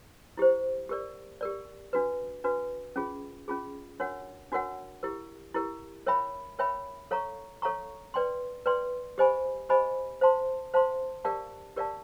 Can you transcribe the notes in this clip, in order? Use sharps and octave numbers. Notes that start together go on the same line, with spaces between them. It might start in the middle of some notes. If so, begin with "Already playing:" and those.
E4 G4 C5
G4 A#4 D5
G4 A#4 D5
D4 F#4 B4
D4 F#4 B4
C#4 F4 G#4
C#4 F4 G#4
D4 F#4 A#4 C#5 F#5
D4 F#4 A#4 C#5 F#5
E4 G4 A#4
E4 G4 A#4
A#4 C#5 E5 G5 B5
A#4 C#5 E5 G5 B5
A4 C#5 F5 A#5 C#6
A4 C#5 F5 A#5 C#6
B4 D5 G5 C6
B4 D5 G5 C6
G4 C5 D#5 G#5 B5
G4 C5 D#5 G#5 B5
C5 F5 A5 C6
C5 F5 A5 C6
G4 A#4 D5 F5 A5
G4 A#4 D5 F5 A5